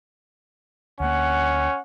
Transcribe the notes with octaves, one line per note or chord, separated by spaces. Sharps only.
D2 A#3 C#4 F#5